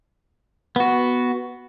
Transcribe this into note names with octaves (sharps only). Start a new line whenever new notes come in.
B3 F#4